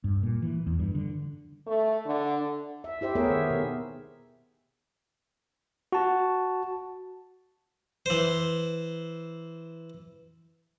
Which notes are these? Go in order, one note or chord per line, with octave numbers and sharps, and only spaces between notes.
G2
A#2
E3
E2
G2
D3
A3
D3
E5
E4 G4 C5 E5
A3 B3 G#4 A#4 C#5 E5
D#3
B2
F#4 A5
E3 C5